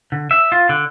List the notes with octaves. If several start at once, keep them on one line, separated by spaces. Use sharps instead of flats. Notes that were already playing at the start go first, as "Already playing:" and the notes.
D3
E5
F4
D3